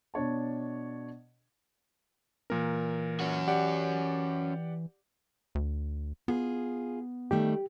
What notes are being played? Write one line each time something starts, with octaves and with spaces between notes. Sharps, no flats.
B2 D4 C#5 A5
A#2 E3 A#4
C#4 F#4
G4 D5 F#5
D2
B3 F4 G#4
D#3 G3 A3 G4